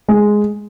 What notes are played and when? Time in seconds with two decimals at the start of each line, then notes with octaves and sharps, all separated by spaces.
0.08 G#3